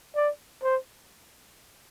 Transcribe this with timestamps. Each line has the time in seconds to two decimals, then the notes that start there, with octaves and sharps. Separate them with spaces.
0.16 D5
0.63 C5